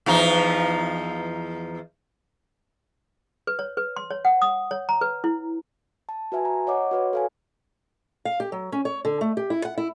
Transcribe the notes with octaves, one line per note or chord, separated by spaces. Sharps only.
E2 F3 D#4
B4
C#5
B4
C6
C#5
F#5
D#6
C#5
A#5
B4
E4
A5
F#4 B4 E5 G#5
A#5
C#5 D#5 F#5 D6
F#4 B4 C#5
A4 F5 G#5
F5
G4
F#3
C#4
C#5
D3
A3
G4
E4
F#5
E4